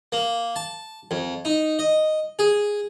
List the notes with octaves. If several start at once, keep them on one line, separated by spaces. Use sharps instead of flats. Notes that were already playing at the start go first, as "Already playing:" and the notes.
A#3
A5
F2
D#4
D#5
G#4